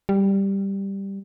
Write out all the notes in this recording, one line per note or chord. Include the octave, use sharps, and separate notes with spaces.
G3